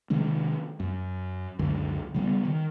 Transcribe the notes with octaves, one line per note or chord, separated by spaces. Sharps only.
C3 D#3 G#3 C#4
F#2
C#2 F#2 D3
C#3 G3 A#3 B3
D#3